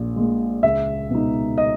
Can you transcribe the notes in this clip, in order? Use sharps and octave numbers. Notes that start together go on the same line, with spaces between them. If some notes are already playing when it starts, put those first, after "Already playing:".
Already playing: A#1 A#2
A#2 G#3
C#2 E5
B2 G#3 D#4
D#5